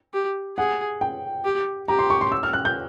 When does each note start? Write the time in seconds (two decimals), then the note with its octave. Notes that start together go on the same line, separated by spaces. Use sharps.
0.14 G4
0.57 G#4 F#5
1.01 G5
1.45 G4
1.88 G4 A#5
1.99 C6
2.10 C#6
2.21 C6
2.32 E6
2.43 F6
2.53 F#6
2.65 G6